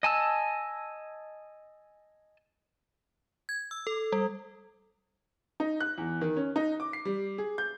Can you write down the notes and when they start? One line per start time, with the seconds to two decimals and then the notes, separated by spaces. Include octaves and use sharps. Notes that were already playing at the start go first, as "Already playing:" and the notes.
0.03 D#5 G#5 A5 E6
3.49 G#6
3.71 E6
3.87 A4
4.12 G3
5.60 D#4
5.80 F#6
5.98 E2
6.21 D#3
6.37 C#4
6.56 D#4
6.80 D6
6.93 C7
7.05 G3
7.38 G#4
7.58 G6